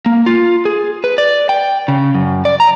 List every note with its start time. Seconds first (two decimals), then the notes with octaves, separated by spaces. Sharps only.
0.06 A#3
0.26 F4
0.65 G#4
1.04 B4
1.18 D5
1.49 G5
1.88 C#3
2.15 F#2
2.45 D5
2.60 A#5